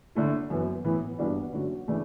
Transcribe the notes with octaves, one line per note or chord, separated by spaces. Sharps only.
D3 A3 E4
F#2 E3 B3
A2 E3 B3 E4
G2 E3 B3 D4 F#4
D3 F#3 A3 C#4 F#4
C#3 E3 A3 D4